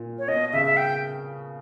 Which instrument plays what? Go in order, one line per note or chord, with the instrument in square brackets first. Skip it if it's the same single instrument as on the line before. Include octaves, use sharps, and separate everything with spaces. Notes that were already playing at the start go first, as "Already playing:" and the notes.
Already playing: [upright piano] A#2
[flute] C#5
[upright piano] B2 [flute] D#5
[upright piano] C#3 [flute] E5
[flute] E5
G5